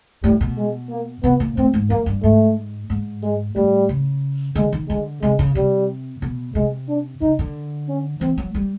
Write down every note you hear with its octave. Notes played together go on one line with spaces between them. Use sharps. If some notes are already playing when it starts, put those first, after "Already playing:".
A2 G3
B2
G#3
A#3
C3 B3
A#2
A2 C4
G#2
F#2 A#3
G2
G#2 A3
G#2
G#3
A2 G3
C#3
D3 G#3
D#3
D3 G#3
C3 G#3
C#3
C3 G3
B2
C3 G#3
D4
C#3 D#4
D3
C#4
E3 C4
F#3
G3